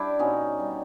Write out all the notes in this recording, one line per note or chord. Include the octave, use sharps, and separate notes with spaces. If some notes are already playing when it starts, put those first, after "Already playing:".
Already playing: G3 D4 E4 G4
B2 C#4 D#4
G3